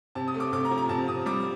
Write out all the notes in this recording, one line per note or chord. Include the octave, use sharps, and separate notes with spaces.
C3 A5
D#6
A3
D6
C3 D6
A#5
F3
A#5
C3 A5
C3 D#6
G3 D6